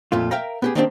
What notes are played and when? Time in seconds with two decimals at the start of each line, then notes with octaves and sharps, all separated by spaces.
0.12 F2 A#2 A3 F4
0.31 A#4 E5 F5 G5 A#5
0.62 B3 G4 G#4
0.75 D#3 A#3 C4 D4 E4 G4